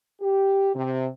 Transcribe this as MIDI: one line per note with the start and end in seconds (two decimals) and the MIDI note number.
0.22 0.70 67
0.75 1.07 48